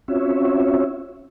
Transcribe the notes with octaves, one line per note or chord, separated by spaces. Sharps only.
C4 C#4 F4 F#4 C#5 E5